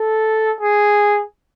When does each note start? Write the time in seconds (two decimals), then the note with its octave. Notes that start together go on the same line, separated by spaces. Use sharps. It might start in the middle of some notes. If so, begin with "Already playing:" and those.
Already playing: A4
0.61 G#4